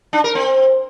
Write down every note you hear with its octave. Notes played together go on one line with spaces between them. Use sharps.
D4
A#4
C4